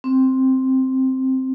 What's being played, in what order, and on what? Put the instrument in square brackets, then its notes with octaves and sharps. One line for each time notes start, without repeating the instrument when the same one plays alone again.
[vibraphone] C4